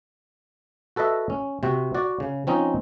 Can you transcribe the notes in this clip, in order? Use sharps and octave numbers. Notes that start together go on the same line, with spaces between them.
F#4 A4 B4 D#5 E5
C#4
C3 C4 F#4
F#4 D5
C#3
F3 C4 C#4 D#4 D#5